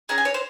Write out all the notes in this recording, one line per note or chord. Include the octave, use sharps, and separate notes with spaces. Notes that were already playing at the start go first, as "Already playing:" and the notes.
C#4 G#4 A#5
G#5
C#5
C5